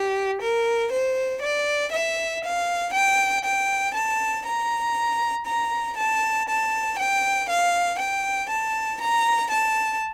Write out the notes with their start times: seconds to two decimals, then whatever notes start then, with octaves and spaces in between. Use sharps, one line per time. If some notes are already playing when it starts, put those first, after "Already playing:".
Already playing: G4
0.41 A#4
0.92 C5
1.42 D5
1.92 E5
2.43 F5
2.93 G5
3.45 G5
3.94 A5
4.46 A#5
5.47 A#5
5.97 A5
6.48 A5
6.98 G5
7.49 F5
7.99 G5
8.50 A5
9.01 A#5
9.51 A5